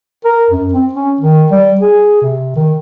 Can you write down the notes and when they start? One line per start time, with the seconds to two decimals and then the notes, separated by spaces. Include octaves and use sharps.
0.25 A#4
0.51 F#2
0.73 C4
0.93 C#4
1.21 D#3
1.52 G3
1.81 G#4
2.22 C3
2.56 D#3